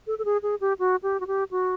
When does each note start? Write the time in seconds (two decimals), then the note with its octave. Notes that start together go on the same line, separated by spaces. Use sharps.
0.07 A4
0.19 A4
0.25 G#4
0.43 G#4
0.61 G4
0.79 F#4
1.03 G4
1.20 F#4
1.27 G4
1.51 F#4